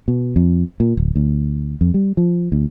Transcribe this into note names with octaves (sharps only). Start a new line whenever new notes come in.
B2
F2
A#2
D1
D2
F2
G3
F3
D2